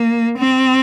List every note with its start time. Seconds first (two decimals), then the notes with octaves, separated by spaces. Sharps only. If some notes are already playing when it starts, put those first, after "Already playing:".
Already playing: A#3
0.38 C4